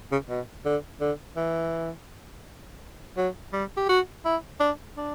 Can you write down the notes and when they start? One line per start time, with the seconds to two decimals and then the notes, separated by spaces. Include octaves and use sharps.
0.12 C#3
0.29 B2
0.65 D3
1.01 D3
1.36 E3
3.17 F#3
3.53 G3
3.77 G4
3.89 F#4
4.25 E4
4.60 D4
4.97 D4